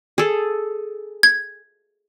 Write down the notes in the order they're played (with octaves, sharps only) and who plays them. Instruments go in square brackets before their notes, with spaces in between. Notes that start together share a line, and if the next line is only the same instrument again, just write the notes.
[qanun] G#4 A4
[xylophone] G#6